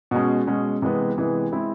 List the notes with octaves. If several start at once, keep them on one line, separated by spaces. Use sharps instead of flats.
B2 G#3 C#4
B2 G#3 C#4
C3 E3 G#3 B3
C3 E3 G#3 B3
G#3 C4 E4